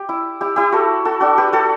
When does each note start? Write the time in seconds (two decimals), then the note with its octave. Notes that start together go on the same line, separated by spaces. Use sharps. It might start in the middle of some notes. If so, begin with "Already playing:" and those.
Already playing: G4
0.09 E4
0.41 E4 G4
0.56 E4 G4
0.72 F#4 A4
1.05 F#4 A4
1.20 D4 F#4
1.38 G4 B4
1.53 F#4 A4